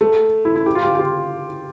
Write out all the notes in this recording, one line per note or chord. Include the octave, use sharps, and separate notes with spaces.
A3
E4
E4
G4
F4
G4
G4
F4